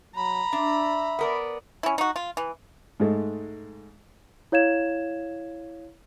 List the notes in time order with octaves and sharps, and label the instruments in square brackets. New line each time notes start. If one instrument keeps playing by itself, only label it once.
[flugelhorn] F#3 [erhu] A#5 [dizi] B5
[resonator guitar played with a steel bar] D4 [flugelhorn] E5
[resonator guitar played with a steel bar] B3 A#4 D5
[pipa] C#4 E4
D#4 F#4
F4
E3
[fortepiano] G#2 G#3 A3
[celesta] E4 C#5 F5 G#6 E7